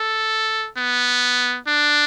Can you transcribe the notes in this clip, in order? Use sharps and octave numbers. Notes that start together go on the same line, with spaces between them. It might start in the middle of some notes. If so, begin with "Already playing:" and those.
Already playing: A4
B3
D4